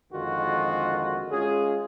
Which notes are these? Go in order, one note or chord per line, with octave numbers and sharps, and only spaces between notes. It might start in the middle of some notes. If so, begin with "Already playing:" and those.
F2 D3 D#3 G#3 F4 F#4
G#3 C#4 F4 G#4